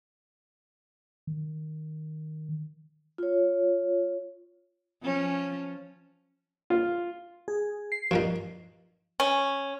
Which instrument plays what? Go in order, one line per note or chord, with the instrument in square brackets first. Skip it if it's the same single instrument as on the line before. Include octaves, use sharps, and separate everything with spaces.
[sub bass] D#3
[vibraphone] F4 C#5
[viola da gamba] F3 C#4
[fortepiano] F4
[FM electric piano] G#4
C7
[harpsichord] G2 A#2 D#4 [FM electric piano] F3
[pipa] C#4